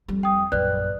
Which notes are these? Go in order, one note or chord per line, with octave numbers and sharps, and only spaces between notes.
F2 G3
G5 D#6
A#1 F#2 B4 D5 F#6